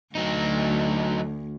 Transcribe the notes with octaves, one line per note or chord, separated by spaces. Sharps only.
D2 F#3 D#4